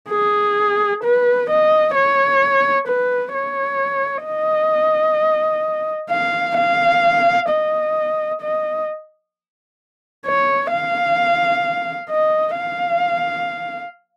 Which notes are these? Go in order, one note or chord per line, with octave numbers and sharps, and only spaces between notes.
G#4
B4
D#5
C#5
B4
C#5
D#5
F5
F5
D#5
D#5
C#5
F5
D#5
F5